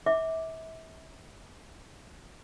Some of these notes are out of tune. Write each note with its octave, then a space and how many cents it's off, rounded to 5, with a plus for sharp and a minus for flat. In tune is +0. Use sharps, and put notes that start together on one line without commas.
E5 -35 D6 +0